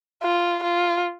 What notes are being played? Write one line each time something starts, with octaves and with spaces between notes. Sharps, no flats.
F4
F4